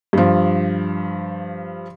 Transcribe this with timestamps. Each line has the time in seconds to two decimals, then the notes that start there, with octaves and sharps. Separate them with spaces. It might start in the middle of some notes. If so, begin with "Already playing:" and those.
0.13 G2 F3